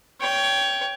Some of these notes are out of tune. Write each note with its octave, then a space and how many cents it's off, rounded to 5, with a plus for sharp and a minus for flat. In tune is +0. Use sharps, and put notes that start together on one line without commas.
C#5 +20 G5 +0